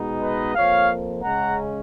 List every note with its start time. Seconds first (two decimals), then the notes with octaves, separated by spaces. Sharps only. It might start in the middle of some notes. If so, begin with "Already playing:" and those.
Already playing: B2 G#3 B3 D#4
0.22 B4 D#5
0.55 F2 F3 A#3 C#5 F5
1.23 C#3 G#3 C#4 F#5 A#5